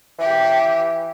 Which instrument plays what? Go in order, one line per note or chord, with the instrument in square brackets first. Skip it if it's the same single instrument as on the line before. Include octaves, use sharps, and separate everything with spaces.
[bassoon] E3 [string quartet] G4